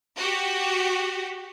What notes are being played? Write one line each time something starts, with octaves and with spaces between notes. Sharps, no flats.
F#4 G4